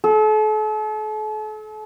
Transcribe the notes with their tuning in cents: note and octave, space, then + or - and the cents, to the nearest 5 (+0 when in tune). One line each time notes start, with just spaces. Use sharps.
A4 -40